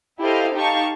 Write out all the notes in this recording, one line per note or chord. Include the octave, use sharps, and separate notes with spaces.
E4 G4 A4 C5 D#5 F5
D#4 G4 F5 A5 C#6